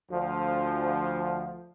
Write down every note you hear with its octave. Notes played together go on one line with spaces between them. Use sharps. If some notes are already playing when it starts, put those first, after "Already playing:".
D2 F3